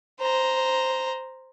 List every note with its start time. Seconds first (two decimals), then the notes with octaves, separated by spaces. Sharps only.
0.21 C5 A#5